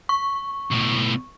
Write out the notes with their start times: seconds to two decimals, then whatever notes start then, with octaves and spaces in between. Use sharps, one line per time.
0.09 C#6
0.72 B1 A2